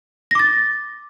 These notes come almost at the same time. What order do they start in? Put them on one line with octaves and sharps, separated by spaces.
A#6 D6 A6